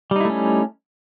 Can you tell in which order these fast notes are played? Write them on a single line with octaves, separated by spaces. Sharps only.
G3 D#4 E4 A3 C#4